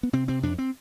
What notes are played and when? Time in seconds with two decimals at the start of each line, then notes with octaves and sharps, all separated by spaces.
0.03 B3
0.13 C3 C4
0.28 C3 C4
0.43 F2 D4
0.58 C4